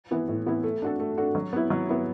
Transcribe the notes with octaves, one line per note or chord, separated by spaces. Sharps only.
E3 B3 E4
A2
E3 B3 E4
A3
D4 F#4 A4
A3
D4 F#4 A4
F#3
B3 E4
F#3
B3 E4